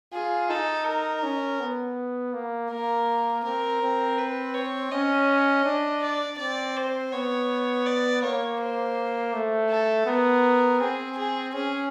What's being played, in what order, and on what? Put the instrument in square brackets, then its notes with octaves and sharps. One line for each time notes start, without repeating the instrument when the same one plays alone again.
[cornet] F4 [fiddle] G#4
[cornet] D#4 [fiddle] A4
[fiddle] A#4
[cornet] C#4
B3
A#3
[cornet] A#3 [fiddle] A#4
[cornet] C4 [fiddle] A#4
[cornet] C4
[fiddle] B4
C#5
[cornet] C#4 [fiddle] D#5
[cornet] D4
[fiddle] D5
[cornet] C4 [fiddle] D5
[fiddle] C5
[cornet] B3 [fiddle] C#5
[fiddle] D5
[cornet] A#3 [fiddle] C#5
[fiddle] C5
[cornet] A3
[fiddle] A4
[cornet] B3 [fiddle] A#4
[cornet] C4 [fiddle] G#4
[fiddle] G#4
[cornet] C#4 [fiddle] G#4